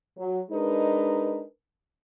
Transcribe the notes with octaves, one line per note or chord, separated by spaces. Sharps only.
F#3
G#3 D4 D#4 A#4 B4